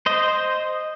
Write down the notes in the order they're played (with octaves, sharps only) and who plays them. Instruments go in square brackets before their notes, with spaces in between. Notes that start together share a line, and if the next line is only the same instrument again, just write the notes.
[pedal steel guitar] C5 D#5